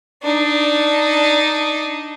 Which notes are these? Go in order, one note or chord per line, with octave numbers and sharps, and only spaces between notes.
D4 D#4